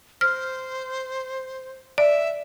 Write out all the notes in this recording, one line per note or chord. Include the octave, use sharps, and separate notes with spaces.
C5 F6
D5 E5